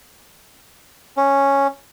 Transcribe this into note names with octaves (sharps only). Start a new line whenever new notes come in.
C#4